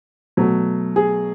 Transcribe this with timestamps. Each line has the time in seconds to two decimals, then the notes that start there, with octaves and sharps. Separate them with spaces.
0.37 B2 F#3 A3
0.96 G#4